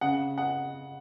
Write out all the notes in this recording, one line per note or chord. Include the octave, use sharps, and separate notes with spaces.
C#3 F#5
F#5